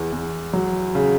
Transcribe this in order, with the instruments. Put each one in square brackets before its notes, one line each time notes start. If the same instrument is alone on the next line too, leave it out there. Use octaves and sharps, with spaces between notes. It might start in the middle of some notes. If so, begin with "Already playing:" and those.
Already playing: [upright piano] E2
E2
F#3
C#3